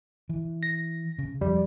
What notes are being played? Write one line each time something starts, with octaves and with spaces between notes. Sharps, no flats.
E3
A#6
C#3
F2 G3